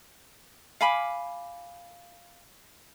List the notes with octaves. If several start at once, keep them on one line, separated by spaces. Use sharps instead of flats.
F5 G#5 B5 D6